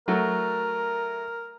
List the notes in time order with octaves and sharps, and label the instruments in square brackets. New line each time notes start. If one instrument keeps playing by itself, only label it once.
[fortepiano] F#3 A3 [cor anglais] A#4